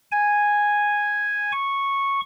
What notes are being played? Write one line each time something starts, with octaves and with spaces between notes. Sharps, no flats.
G#5
C#6